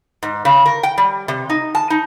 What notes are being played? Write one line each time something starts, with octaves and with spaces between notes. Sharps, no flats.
G#2
C#3
A#4
G5
G3
C3
D#4
A5
D#4